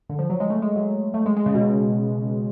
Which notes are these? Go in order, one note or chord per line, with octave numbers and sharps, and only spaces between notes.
D3
F3
F#3
G#3
A3
G#3
F#3
A3
G#3
G#3
C#3
B2